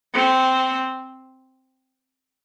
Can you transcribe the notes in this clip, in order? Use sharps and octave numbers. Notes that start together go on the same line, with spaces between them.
C4